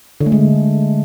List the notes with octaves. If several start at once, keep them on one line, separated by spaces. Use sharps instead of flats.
D3
A3
G#3